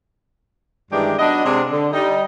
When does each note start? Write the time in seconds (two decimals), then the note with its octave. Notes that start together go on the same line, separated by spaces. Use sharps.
0.91 G2 D#3 E3 G#3 D4 G4
1.18 F#3 B3 D4 D#5
1.44 C3 G#3 C4 D4
1.71 D3
1.92 G3 D#4